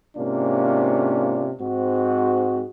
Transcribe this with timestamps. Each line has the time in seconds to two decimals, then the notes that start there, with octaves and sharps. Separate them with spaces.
0.16 G#2 C3 A#3 C#4 D4 F4
1.61 G#2 C4 F#4